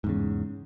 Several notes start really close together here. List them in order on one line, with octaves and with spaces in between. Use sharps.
G#2 E2 C#3